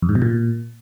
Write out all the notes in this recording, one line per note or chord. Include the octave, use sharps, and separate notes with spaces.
F2
G#2
B2
A#2